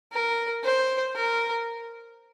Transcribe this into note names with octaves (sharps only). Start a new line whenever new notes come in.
A#4
C5
A#4